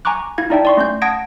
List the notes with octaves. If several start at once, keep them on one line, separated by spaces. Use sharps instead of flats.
G#5 A#5 C#6 D6 F#6
E4 F5 G#6
D#4 E4 D5 E5 G5 A5
D5 C6 C#6
A3 C#4 C6 G6
F#5 A5 D#6 G#6 A#6 D7